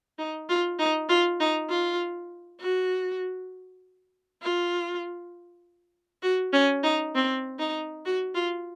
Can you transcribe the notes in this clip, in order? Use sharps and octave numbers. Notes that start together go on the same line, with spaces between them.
D#4
F4
D#4
F4
D#4
F4
F#4
F4
F#4
C#4
D#4
C4
D#4
F#4
F4